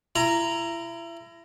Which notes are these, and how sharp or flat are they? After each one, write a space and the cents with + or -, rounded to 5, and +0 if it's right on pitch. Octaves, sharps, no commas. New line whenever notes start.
E4 +30 A#5 +0